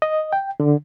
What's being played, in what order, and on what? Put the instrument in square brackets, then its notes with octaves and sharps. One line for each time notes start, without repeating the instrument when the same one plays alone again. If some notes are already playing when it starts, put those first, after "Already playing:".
[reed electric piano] D#5
G5
D3